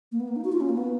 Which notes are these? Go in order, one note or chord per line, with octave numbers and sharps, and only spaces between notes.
A#3
B3
A#3
D#4
F#4
F4
C#4
A#3
B3